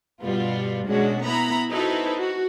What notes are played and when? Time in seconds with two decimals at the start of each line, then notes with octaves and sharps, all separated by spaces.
0.23 G2 B2 G3 B3 F4
0.87 B2 G#3 C#4 D4 F#4
1.22 B3 E4 A#5 B5
1.71 D#4 E4 F#4 A4 B4 C5
2.17 F#4